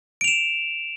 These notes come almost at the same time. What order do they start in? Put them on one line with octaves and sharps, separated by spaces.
D7 F7 E7